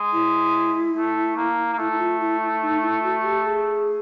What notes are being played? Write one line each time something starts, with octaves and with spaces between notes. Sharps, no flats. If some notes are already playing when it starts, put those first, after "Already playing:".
Already playing: G#3
E4
A3
A#3
A#3
A3 E4
E4
F4
E4
E4
D#4
E4
F#4
G4
G#4